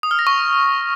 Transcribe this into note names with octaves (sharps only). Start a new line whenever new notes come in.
D#6
F6
A#6
C#6